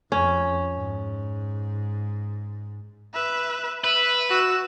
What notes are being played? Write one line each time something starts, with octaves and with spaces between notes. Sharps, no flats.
F2 C#4
G#2
B4 E5
B4 E5
F#4 E6